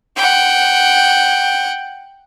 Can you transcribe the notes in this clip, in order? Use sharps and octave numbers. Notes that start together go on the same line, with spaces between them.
F#5 G5